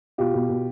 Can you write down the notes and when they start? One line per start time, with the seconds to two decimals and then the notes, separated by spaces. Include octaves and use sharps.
0.18 B2 F4 G4
0.34 B2
0.49 B2